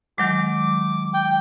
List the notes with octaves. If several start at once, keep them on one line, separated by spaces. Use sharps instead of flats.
D#3 F#3 G#3 D6
G5